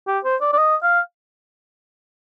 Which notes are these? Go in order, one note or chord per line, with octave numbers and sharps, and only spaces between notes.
G4
C5
D5
D5
D#5
F5